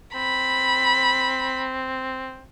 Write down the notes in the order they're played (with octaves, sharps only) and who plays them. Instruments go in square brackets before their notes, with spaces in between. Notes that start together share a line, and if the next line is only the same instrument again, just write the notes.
[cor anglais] C4 [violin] B5